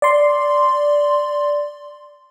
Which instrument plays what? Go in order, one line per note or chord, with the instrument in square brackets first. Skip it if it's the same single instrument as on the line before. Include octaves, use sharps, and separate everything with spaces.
[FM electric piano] D5 C6